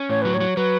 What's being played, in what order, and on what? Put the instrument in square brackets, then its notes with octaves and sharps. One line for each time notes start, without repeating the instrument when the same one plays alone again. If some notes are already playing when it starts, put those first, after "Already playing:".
Already playing: [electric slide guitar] C#4
[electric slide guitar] A2 [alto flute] C#5
[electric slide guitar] F#3 [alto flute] B4
[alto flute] C#5
[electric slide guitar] F#3
[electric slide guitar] F#3 [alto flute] B4